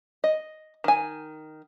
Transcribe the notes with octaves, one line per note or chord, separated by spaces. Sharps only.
D#5
D#3 G#5